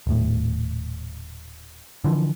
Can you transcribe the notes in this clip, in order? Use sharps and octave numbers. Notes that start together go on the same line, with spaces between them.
D#1 A2
D3 E3 F3